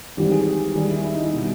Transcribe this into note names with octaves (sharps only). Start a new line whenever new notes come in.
G#1 G#2 E3 G3 G4
G#4
D#2 D#3 G3 G#4
E4
E4
D#4
E4
B2 G3